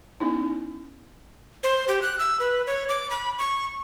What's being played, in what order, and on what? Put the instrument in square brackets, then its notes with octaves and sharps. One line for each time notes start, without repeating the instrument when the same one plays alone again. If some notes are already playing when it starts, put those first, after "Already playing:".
[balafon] B3 C#4 D#4 E4
[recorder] C5
G4
F#6
E6
B4
C#5
D6
B5
C#6